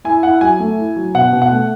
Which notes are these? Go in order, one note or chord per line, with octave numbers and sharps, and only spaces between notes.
E4 G#5
E4 F#5
F#3 G#5
A3
E4
F#3
B2 F#5
B2
F#5
A3